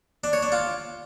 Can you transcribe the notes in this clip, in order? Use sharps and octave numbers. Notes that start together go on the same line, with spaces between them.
D4
C#5
D4
F4